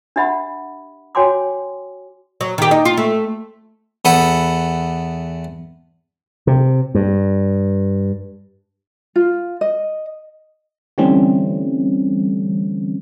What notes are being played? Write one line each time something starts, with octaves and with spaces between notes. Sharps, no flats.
D4 G4 E5 F#5 B5
F#4 C#5 G5 G#5 C6 D6
F#3
D#3 G4
D#4
F4
A3
E2 A4 B4 F#5
C3
G2
F4
D#5
D3 E3 G3 A3 C4 C#4